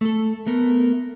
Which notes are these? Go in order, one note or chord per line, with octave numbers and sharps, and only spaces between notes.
A3 A4
A3 B3 A#4